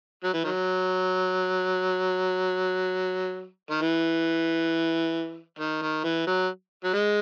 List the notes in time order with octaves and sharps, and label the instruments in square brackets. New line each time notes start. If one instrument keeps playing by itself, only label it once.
[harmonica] F#3
E3
D#3 F#3
D#3
E3
D#3
D#3
E3
F#3
F#3
G#3